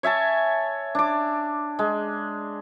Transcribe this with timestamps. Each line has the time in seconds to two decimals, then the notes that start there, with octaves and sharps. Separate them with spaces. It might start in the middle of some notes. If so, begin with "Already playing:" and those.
0.03 C#5 E5 G#5 A5
0.95 D4 D6
1.79 G#3